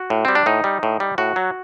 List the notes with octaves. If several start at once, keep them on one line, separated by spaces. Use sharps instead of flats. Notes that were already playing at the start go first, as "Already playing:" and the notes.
Already playing: F#4
A2
G3 C4
D4
A2 D#4
G3
A2
G3
A2 F#4
F#3